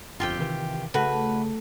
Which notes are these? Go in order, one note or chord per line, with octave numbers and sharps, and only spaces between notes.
G1 F2 F4 G4 G5
C3 D#3 E3
C#3 A3 F#4 B4